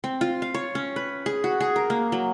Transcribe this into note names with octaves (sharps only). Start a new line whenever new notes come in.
C4
F4
F5
C#5
C#4
B4
G#4
F#4
G#4
A#4
A#3
F#3